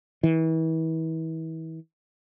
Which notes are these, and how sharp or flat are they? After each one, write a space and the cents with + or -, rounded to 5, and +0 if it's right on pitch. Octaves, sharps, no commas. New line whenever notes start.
E3 -35